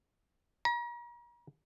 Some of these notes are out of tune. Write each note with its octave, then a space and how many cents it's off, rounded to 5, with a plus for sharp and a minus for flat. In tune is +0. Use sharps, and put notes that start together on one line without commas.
A#5 +40